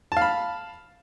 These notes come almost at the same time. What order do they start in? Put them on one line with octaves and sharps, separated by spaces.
A5 F5 B5